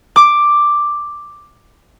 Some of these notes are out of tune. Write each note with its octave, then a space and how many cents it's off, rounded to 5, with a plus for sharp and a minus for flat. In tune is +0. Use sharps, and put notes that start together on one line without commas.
D6 +5